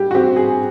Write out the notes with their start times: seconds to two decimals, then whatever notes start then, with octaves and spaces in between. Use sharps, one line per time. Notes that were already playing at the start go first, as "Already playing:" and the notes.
Already playing: G3 G4
0.11 F#4
0.15 C4 G4
0.36 G#4